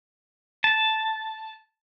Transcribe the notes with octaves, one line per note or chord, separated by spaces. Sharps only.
A5